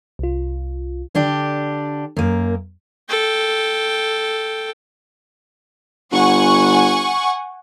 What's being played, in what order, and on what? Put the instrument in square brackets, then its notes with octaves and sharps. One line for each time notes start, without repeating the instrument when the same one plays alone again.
[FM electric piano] C2 F4
[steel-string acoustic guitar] D3 D4 G4
F#2 A#3
[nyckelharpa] A4 G5
[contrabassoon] G1 [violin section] F#5 G#5 C#6